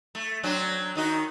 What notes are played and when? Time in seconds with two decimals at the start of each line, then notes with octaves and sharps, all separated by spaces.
0.15 A3
0.43 F#3 C4 D4
0.95 D#3 D#4 F#4